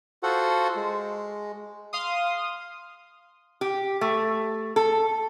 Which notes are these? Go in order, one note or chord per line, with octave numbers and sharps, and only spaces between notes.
F4 F#4 A4 C5 F#5
G#3
F5 C6 D#6
G4
A3
A4